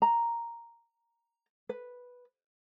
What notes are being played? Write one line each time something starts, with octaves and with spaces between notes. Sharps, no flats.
A#5
B4